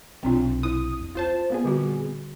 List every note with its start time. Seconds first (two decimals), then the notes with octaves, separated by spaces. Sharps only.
0.23 B1 C3 C4 D4 F4
0.63 E4 D#6
1.00 E2
1.15 C4 F4 C5 A5
1.50 A#2 B3 G#4
1.64 D3 G3 F#4